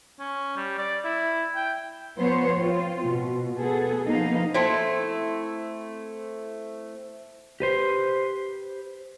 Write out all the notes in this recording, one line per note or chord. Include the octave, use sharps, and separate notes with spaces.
C#4
G3
D5
E4
G5
F3 B3 C5 C#5
C4 F4
B2
B3 G#4 A4
F3 A#3 B3 D#4 F5
A3 C4 E4
G4 B4 C5